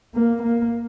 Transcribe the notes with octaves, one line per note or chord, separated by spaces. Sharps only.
A#3
A#3